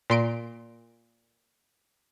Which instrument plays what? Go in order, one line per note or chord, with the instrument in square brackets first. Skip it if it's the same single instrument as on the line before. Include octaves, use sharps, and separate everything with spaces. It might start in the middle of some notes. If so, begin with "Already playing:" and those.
[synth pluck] A#2 C6 D7